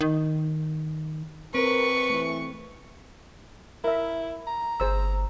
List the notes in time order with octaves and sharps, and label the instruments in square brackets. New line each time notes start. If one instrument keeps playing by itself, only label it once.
[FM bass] D#3
[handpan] C4 [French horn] A#4 [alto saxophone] B4 [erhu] C#6
[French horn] E3 [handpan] A3
[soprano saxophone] E4 [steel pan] A#4 E5
[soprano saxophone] A#5
[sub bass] G1 [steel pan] G#4 C5 E6